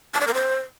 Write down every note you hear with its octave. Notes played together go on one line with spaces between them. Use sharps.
A5
D5
A#4
C5